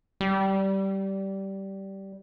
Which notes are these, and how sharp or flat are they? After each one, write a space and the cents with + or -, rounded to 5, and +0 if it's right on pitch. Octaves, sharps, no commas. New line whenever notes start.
G3 -15